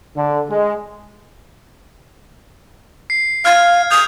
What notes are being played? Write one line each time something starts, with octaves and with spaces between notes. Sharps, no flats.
D3
G#3
C7
F5 F6 G#6
D#6 G6 F7